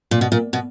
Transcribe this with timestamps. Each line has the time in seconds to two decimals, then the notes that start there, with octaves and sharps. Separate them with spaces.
0.11 A#2
0.21 B2
0.32 A#2
0.53 B2